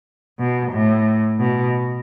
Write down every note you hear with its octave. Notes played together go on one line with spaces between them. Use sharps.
B2
A2
B2